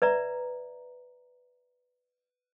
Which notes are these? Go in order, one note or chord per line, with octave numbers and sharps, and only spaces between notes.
B4 D5 E5 A#5